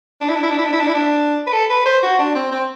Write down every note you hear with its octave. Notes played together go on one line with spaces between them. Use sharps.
D4
E4
D4
E4
D4
E4
D4
E4
D4
E4
D4
B4
A4
B4
C5
F#4
D4
C4
C4